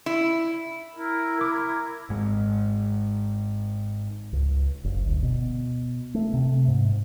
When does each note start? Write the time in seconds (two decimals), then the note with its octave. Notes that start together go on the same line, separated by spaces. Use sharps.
0.06 E4
0.95 E4 A#4
1.39 A#4 A#5 D6
2.09 G#1 G#2 G#3
4.33 C#2
4.84 F#1
5.05 D2
5.23 B2
6.14 A3
6.34 C3
6.68 G#2